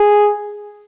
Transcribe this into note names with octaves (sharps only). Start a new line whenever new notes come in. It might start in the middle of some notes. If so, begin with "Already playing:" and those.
Already playing: G#4